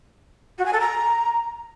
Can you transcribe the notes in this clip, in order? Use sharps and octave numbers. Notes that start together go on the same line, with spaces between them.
F#4
G#5
A4
A#5